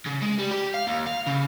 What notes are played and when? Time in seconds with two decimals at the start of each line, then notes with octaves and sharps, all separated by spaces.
0.06 C#3
0.22 G#3
0.38 G3
0.51 G4
0.74 F5
0.87 D#2
1.07 F5
1.27 C#3